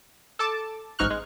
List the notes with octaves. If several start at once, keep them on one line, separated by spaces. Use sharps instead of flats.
A4 A5 D6
A1 G#2 D#4 C#6 F6 F#6
G#3